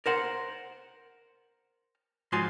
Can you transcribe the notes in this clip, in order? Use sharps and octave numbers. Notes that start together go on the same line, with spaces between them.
A#4 C5 F#5
G#2 F3 F4 F#4 G#5 C6